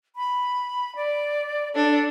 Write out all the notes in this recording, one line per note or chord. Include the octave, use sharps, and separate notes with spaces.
B5
D5
D4 A4